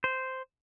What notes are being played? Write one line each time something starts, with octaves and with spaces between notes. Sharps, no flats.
C5